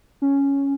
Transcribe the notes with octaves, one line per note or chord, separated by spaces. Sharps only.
C#4